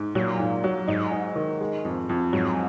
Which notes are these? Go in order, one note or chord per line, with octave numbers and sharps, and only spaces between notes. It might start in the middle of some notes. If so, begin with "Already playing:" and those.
Already playing: G#2
A#2 F#3
G#2
F#3
G#2 D#4
D#4
D#3
G#3
F2
F2
G#2 F#3